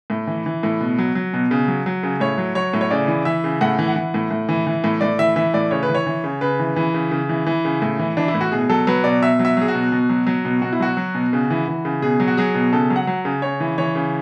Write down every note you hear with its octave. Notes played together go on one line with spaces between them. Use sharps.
A2
E3
E3
A2
B2
F#3
F#3
B2
C#3
F#3
F#3
C#3
A2 C#5
F#3
F#3 C#5
A2
C#5
C#3 D5
E3
E3 E5
C#3
A2 F#5
E3
F#5
E3
A2
A2
E3
E3
A2
A2 D5
E3 E5
E3 E5
A2 D5
C#3 C#5
B4
E3
C#5
E3
C#3
C#3 B4
E3
E3
C#3
C#3
E3
E3
C#3
A2
E3
E3 D4
E4
A2
F#4
B2 G#4
F#3 A4
F#3 B4
B2 D5
B2 E5
F#3
E5
F#3 G#4
F#4
B2
B2
F#3
F#3
B2
B2 F#4
E4
F#3 F#4
F#3
B2
C#3
E3
E3
C#3
B2 G#4
F#3
F#4
F#3 G#4
B2
C#3 A4
F#3
F#5
F#3
C#3
C#3 C#5
E3
E3 C#5
C#3